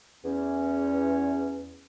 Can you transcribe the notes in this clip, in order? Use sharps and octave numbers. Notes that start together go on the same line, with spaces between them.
E2 C#4